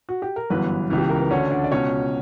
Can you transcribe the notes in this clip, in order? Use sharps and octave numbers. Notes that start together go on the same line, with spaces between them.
F#4
G4
A#4
G1 F#2 E3 B3 B4
C#2 C#3 E3
G4
A#4
B4
D2 D3 C#4 C#5
D4 D5
D5
C#2 B2 C#4 C#5